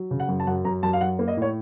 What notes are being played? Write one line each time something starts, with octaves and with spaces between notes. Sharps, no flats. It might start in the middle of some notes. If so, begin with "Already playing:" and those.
Already playing: F#3
C#3
F#5
F#2
A5
F#2 F#5
F#2 A#5
F#2 A5
F5
F#3 F#5
A#3
D#5
A2 C#5